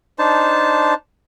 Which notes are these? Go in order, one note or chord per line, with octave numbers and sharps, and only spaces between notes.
D4 D#4 C5 A5